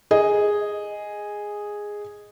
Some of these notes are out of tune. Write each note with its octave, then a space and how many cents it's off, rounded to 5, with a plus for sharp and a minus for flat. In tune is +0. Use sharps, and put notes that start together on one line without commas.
G#4 -5 D#5 +0